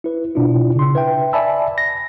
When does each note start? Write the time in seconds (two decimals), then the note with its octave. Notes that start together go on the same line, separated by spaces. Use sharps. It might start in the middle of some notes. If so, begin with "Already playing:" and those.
0.04 E4 B4
0.35 B2 D4 E4 F4
0.76 C#3 C6
0.95 B4 E5 G5
1.33 D5 E5 G#5 A5 B5 E6
1.78 A#6